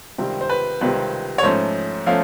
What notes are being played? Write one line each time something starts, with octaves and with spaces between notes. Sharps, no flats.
C#2 C3 D#3 G3 C4
C5
B4
C#2 C3 D#3 G3 C4 B4
C#5
G#2 F3 A3 C#4 C5
F3 A3 C#4 F5